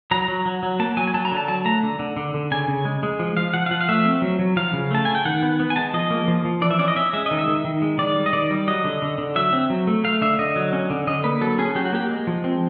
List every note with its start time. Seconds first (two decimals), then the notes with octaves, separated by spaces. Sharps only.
0.11 F#3 A#5
0.28 F#3
0.46 F#3
0.63 F#3
0.79 A#3 A5
0.97 F#3 G#5
1.07 G#5
1.14 F#3 A5
1.25 A#5
1.32 D3
1.37 A5
1.48 F#3 A5
1.65 A3 A#5
1.83 D3
1.99 D3
2.17 D3
2.34 D3
2.51 C#3 G#5
2.68 C#3
2.85 G#3
3.03 G#3
3.19 F3
3.37 F3 F5
3.54 F3 F#5
3.66 F5
3.71 F3 F#5
3.81 F5
3.89 A3 E5
4.05 C4
4.22 F#3
4.39 F#3
4.56 F3 F5
4.73 C#3
4.91 A3 A5
5.05 C#3 G#5
5.15 G5
5.25 D#3 F#5
5.43 B3
5.60 B3
5.70 G#5
5.76 G#3 A5
5.94 F3 D#5
6.10 A#3
6.28 F3
6.45 F3
6.62 E3 D5
6.71 E5
6.79 C#4 D5
6.88 D#5
6.96 C#4 E5
7.13 G#3 E5
7.26 D#3 D#5
7.39 E5
7.48 D#3
7.65 D#3
7.82 G#3
7.98 D#3 D5
8.16 G3
8.26 D#5
8.33 D#3 D5
8.51 G3
8.68 F#3 D#5
8.84 D3
9.02 D3
9.18 D3
9.36 F#3 E5
9.53 C4
9.70 F#3
9.87 A3
10.04 A3 F5
10.22 D3 E5
10.39 D3 D#5
10.56 F#3
10.73 C#4
10.90 D3
11.07 D3 D#5
11.24 A#3 B4
11.41 F#3 A4
11.58 C#4 G#4
11.75 F#3 G4
11.85 F#4
11.93 A#3 G4
12.10 G#3
12.27 F3
12.44 C4